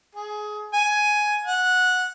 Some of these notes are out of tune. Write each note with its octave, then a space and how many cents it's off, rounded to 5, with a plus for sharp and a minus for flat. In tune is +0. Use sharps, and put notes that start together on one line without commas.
G#4 +20
G#5 +10
F#5 -15